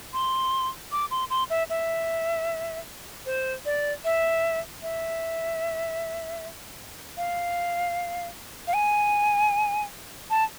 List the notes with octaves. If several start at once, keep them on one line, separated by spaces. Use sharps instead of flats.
C6
D6
C6
C6
E5
E5
C5
D5
E5
E5
F5
F5
G#5
A5